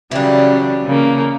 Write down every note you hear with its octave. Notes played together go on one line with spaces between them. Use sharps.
C#3 E3 F#3 G3 D4
C#3 A#3